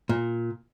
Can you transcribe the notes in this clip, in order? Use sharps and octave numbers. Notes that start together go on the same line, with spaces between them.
A#2